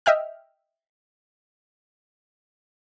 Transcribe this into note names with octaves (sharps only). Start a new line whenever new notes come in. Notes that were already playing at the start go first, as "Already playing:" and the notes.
D#5 E5 G5 F6